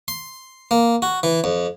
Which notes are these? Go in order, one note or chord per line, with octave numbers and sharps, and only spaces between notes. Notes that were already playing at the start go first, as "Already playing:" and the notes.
C6
A#3
F#4
E3
F2